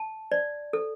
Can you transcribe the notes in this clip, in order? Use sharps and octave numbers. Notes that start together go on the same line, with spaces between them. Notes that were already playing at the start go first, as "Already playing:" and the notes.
Already playing: A5
D5
A4